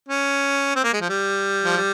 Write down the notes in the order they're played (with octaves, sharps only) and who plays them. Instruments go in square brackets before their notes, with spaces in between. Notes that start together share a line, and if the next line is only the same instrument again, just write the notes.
[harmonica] C#4
C4
A#3
G#3
F3
G3
F3
G3